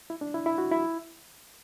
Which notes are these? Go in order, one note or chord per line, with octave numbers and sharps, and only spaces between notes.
E4
D4
E4
E4
F#4
E4